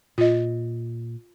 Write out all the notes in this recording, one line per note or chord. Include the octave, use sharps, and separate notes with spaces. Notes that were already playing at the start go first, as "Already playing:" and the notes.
A#2 F4 D#5